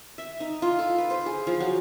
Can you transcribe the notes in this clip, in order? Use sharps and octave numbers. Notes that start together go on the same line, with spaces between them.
E5
D#4
F4
A4
B4
C5
G#4
F3
F#3